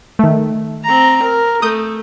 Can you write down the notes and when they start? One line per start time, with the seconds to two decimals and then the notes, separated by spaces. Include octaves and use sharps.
0.19 D#3 A3
0.84 C4 A#5
1.22 A#4
1.62 A3 D#6 G6